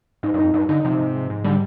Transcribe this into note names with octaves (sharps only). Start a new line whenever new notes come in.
G#2 D#4
G2
F2 D#4
G2 D#4
D3 D#4
C3 F3
G#2
G#2
G#2
D3 G3